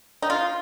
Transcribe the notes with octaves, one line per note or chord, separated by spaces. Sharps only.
D#4
F4